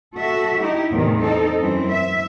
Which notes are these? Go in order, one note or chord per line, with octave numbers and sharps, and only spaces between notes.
F#4 A4 E5
D#4 E4 G4
E2 A2 C3 D#3
C4 D#4 A4
F#2 E3 C4
E5